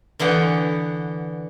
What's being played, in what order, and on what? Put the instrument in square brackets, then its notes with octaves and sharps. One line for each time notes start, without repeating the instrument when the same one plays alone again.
[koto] D3 E3 B3 F#5 G5